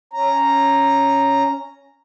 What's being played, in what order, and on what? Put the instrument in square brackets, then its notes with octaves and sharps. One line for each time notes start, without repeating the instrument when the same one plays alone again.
[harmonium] C#4 A#5